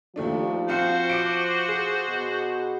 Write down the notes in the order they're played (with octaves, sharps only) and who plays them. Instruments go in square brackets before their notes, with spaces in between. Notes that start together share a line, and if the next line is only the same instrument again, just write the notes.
[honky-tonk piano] D#2 A3 D4 [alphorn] F3
[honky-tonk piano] C4 F5 C#7 [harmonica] F#4 C5
[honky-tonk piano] D6 C#7 D7
G#4
[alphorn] B2